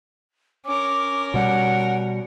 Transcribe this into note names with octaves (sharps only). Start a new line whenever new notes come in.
C#4 A#4 D6
B2 G3 F#5